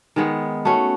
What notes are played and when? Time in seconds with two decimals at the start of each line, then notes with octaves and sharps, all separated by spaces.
0.16 D#3 G#3 B3
0.65 A3 C#4 F#4